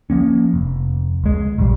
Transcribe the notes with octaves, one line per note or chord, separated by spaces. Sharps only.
F3 A#3 C#4
F1
C#2 G#3
A#1 E2 G3